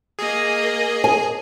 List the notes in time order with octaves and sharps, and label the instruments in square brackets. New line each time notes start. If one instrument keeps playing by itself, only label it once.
[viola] A#3 D#5 [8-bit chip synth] G#4
[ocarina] A#4
[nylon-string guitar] G#5